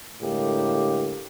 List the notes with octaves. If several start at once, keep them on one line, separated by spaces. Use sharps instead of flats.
A2 D3 G#3 A#3 G4